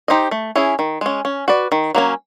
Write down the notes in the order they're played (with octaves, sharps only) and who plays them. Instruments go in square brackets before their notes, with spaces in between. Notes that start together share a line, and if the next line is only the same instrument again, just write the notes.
[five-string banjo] D#4 G4 C5 D#5
A3
C#4 E4 G#4
D#3
G#3 C#4
C#4
F#4 B4 D5
D#3
F#3 A#3 C#4